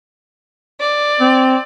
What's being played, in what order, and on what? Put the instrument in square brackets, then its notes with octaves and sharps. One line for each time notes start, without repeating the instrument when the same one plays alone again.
[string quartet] D5
[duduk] C4